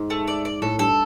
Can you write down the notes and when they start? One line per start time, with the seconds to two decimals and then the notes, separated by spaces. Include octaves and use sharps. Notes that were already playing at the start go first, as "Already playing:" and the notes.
Already playing: G#2
0.10 A3
0.28 D5
0.45 D5
0.62 A2 A4
0.79 G2 A4